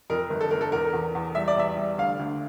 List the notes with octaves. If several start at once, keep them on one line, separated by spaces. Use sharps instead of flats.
F2 A#4
G1
A4
G1 A#4
A4
E2 A#4
E2
E2
G3 E5
D5
E2 E5
G3
D2 F5
D2